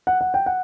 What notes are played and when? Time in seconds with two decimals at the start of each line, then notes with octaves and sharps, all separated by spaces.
0.07 F#5
0.21 F#5
0.34 G5
0.46 F#5